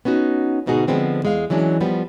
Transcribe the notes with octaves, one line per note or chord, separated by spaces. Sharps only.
B3 C#4 D#4 F#4
D2 G#2 B2 D#4 F#4 G#4
D3 F3 G#3 B3 C4 D4
E2 G#3 F5
E3 F#3 G#3 C#4 D4
F3 G3 B3